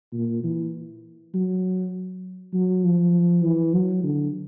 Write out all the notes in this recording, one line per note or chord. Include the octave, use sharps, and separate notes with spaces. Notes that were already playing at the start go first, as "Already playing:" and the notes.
A#2
E3
F#3
F#3
F3
E3
F#3
D3